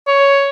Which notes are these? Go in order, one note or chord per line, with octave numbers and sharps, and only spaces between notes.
C#5